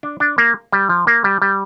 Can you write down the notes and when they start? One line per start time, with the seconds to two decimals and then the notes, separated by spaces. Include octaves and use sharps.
0.03 D4
0.20 D4
0.38 A#3
0.72 G3
0.89 F3
1.07 A#3
1.24 G3
1.42 G3